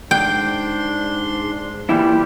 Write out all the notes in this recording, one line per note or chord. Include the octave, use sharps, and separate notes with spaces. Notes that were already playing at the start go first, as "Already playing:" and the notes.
G#2 D4 G5 C6
A#2 E3 G3 E4 G4